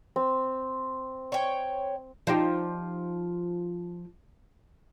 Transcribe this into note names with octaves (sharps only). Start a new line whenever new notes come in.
C4
C#5 G5
F3 D#4 G4